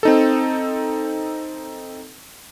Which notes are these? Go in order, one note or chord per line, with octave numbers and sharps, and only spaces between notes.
C4 D#4 A4